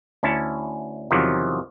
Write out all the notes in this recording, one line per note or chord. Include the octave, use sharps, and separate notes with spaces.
D2 C#4 E4 A5
E2 C3 D#3 F3 F#3